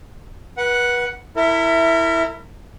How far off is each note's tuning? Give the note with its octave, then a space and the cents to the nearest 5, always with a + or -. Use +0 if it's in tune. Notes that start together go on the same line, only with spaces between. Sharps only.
B4 -30 F#5 +0
E4 +0 A#4 -35 E5 +5